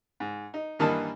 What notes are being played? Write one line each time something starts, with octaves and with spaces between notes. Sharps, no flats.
G#2
D#4
G2 D#3 E3 A#3 D#4 A5